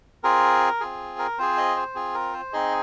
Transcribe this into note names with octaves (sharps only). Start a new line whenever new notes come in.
C4 F4 G#4 A#4
C4 F4 G#4
A#4
C4 F4 G#4 C5
D#5
C5
C4 F4 G#4
A#4
C5
C4 D#4 G#4 D#5